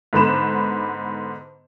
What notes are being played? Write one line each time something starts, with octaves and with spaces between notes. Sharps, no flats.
G#2 D3 B3 B5 E7